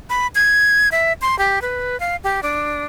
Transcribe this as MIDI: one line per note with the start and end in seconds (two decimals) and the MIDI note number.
0.10 0.27 83
0.35 0.89 92
0.92 1.13 76
1.22 1.37 84
1.39 1.62 67
1.62 1.99 71
2.00 2.16 77
2.24 2.40 67
2.43 2.85 62